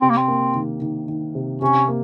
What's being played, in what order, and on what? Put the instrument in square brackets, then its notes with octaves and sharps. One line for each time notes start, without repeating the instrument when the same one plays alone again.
[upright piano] C3 [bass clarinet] C4
[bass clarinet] A#3
C4
[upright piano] A#3
D#3
D#3
D#3
C3
[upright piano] C3 [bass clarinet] C#4
[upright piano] A#3